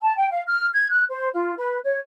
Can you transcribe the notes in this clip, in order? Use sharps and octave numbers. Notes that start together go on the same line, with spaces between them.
A5
G5
F5
F6
G#6
F#6
C5
F4
B4
C#5